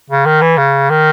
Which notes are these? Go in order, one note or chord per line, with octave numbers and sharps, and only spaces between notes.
C#3
D#3
E3
C#3
D#3